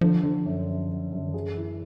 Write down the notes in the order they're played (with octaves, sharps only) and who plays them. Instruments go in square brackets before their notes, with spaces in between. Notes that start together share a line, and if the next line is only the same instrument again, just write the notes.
[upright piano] D3 [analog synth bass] F3
[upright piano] D3
F#2
F#2
F#2
F#2
[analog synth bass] D3
D#3
[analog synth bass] E3 [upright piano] G#4
[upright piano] E4